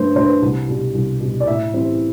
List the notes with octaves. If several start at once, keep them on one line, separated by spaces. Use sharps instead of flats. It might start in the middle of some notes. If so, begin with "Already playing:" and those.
Already playing: G2 D3 A3 B4 C5
D3 A3 C5
B4
C2
B2 G3
C2
B2 G3
D5
A2 E5
E3 G3 C4 E4